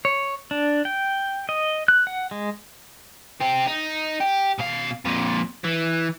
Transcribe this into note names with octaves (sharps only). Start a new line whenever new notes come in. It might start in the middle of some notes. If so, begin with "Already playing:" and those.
C#5
D4
G5
D#5
F#6
F#5
G#3
C4 G4
D#4
G4
B2 F5
F2 A#2
E3